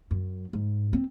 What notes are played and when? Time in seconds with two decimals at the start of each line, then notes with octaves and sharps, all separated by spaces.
0.11 F#2
0.53 G#2
0.93 C4